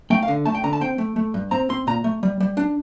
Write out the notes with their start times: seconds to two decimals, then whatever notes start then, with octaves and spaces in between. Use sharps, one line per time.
0.10 A3 G5
0.23 F5
0.28 D3
0.45 A3 A5
0.55 G5
0.64 D3 A#5
0.73 A5
0.81 C4 G5
0.98 A3
1.16 A3
1.34 G2
1.51 C4 A#5
1.69 C4 C6
1.87 A#2 A#5
2.04 A3
2.23 G3
2.40 G3
2.57 D4